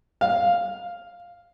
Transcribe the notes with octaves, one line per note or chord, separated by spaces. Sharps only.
F5